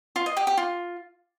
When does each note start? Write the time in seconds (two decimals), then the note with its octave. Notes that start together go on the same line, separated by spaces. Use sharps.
0.16 F4
0.26 D#5
0.37 G4
0.47 G4
0.57 F4